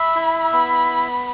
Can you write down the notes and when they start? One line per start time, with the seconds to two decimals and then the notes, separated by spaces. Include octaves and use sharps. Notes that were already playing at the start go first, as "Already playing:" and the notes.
Already playing: E5 B5
0.16 E4
0.53 B3 B5